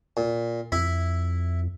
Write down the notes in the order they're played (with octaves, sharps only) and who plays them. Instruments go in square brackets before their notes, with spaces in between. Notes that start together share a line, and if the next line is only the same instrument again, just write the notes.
[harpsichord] A#2
[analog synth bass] F2 [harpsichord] E4 E5